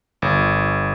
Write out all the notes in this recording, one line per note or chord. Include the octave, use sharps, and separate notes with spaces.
G1